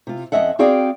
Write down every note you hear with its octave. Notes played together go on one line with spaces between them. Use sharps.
C3 F4
F2 G#3 C#4 D#5 E5 F#5
C4 F#4 G#4 D5 F5 G5